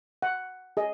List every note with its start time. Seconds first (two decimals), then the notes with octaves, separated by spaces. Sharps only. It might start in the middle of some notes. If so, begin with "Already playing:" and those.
0.22 F#5
0.77 G#4 D#5